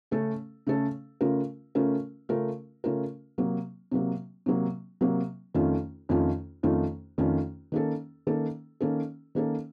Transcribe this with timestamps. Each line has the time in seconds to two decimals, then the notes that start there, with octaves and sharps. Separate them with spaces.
0.11 C#3 A3 C#4 A4
0.67 C#3 A3 C#4 A4
1.21 C#3 A3 C#4 F4 A#4
1.75 C#3 A3 C#4 F4 A#4
2.29 C#3 A3 C#4 F4 A#4
2.84 C#3 A3 C#4 F4 A#4
3.38 C3 F#3 A#3
3.91 C3 F#3 A#3
4.46 C3 F#3 A#3
5.01 C3 F#3 A#3
5.55 F2 D#3 A3 C#4 F4
6.09 F2 D#3 A3 C#4 F4
6.63 F2 D#3 A3 C#4 F4
7.18 F2 D#3 A3 C#4 F4
7.72 D#3 A#3 C#4 A4
8.27 D#3 A#3 C#4 A4
8.81 D#3 A#3 C#4 A4
9.35 D#3 A#3 C#4 A4